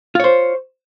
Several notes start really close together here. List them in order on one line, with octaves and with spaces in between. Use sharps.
F4 C#5 C5